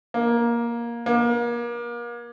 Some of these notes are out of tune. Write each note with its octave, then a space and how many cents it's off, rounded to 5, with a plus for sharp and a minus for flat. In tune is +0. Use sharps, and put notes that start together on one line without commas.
A#3 +15
A#3 +35